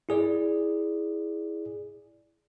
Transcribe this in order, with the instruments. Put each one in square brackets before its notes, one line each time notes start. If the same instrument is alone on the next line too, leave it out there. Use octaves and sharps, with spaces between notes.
[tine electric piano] E4 G#4 D5